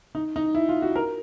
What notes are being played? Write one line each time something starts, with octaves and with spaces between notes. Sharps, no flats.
D#4
D#4
E4
F4
F#4
A#4